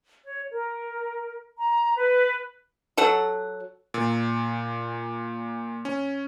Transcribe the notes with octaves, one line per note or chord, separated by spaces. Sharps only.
C#5
A#4
A#5
B4
F#3 A4 F#5
A#2
C#4